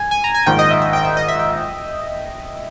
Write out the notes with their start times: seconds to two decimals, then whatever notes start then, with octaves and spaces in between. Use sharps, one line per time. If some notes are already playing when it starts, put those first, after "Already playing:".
Already playing: G#5
0.11 G#5
0.24 A#5
0.35 G#5
0.46 A#1 G#2 D#3 G5
0.59 D#5
0.71 E5
0.82 E5
0.93 G5
1.05 E5
1.17 D#5
1.28 E5
1.39 G5